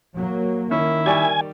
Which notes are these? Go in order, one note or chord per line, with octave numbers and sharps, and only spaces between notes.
F#3 A#3
D#3 C#4 E4
G3 D5 G#5 C#6